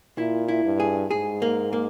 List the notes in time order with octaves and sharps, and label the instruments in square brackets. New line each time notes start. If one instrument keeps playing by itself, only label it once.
[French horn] A#2 [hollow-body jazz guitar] E4
[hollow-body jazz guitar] E4
[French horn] G2
[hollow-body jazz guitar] G#4
[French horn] G#2 [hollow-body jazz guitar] G#4
[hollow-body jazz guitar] A#3
A#3